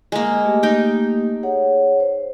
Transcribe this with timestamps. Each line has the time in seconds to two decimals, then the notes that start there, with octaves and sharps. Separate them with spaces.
0.12 G#3 A#3
0.45 A3 A#3 G4
0.63 D#4 G5
1.43 G#4 C#5 F#5
2.00 C5